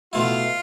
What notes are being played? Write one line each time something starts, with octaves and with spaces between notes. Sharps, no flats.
B2 A3 E4 F4